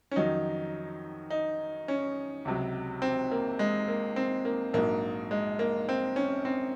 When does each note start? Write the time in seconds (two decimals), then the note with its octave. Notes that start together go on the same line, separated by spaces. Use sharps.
0.11 C#4
0.16 F2 D#3 F#3 D#4
1.30 D#4
1.88 C#4
2.45 C#2 C3 F#3
3.02 C4
3.32 A#3
3.59 G#3
3.88 A#3
4.16 C4
4.45 A#3
4.74 A#1 G#2 F#3 A#3
5.31 G#3
5.59 A#3
5.89 C4
6.16 C#4
6.45 C4